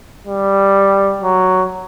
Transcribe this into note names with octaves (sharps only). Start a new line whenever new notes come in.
G3
F#3